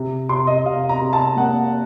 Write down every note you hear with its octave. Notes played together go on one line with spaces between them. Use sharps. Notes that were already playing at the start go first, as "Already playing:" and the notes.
Already playing: C3
C3 C6
D#5
C3 F5
A#5
C3
A5
A#3 F#5